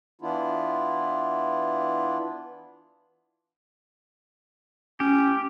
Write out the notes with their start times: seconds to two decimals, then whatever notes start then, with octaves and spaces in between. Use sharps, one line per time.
0.22 E3 B3 D4 E4 F4
5.00 C#4 G4